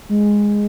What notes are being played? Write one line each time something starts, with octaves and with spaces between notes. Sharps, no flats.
G#3